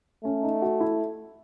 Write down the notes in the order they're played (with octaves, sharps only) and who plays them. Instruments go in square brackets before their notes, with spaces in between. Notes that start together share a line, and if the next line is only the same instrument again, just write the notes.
[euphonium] A3 [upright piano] C#4
[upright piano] D#4
F#4
E4